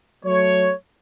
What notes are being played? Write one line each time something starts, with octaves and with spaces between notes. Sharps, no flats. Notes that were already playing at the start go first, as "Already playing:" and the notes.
F#3 A3 C#5